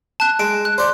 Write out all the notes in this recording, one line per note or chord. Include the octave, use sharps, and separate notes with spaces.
A5 F#6
G#3 D7
F#6
C5 D5